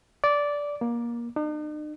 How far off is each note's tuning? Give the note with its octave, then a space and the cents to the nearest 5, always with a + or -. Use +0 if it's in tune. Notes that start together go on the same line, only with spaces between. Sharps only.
D5 -10
A#3 +20
D#4 -45